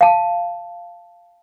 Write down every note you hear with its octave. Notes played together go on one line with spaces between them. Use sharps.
F5 A5